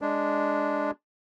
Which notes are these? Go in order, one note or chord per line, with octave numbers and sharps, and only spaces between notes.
G#3 D4